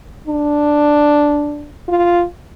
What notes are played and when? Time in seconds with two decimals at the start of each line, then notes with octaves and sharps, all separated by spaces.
0.27 D4
1.88 F4